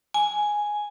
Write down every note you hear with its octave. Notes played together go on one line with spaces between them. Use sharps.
G#5